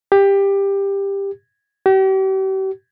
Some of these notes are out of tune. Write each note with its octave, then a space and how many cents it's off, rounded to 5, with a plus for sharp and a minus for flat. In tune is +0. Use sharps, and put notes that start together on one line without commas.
G4 +15
G4 -40